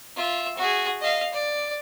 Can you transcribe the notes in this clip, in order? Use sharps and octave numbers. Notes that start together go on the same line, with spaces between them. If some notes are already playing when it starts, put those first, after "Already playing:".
F4 E5
F#4 G#4
D#5 F5
D5